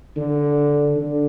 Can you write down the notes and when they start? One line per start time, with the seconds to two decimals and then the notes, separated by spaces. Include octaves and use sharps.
0.17 D3
0.97 D3